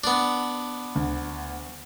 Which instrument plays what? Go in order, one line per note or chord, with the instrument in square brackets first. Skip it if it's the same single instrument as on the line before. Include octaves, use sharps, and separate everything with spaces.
[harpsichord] B3 D4
[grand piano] D2